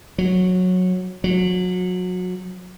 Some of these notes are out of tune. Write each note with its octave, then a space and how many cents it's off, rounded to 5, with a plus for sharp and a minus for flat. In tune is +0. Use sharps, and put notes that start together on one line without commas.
F#3 -15
F#3 -25